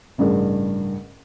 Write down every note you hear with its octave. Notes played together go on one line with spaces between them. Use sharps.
A1 G2 C#3 G#4 A#4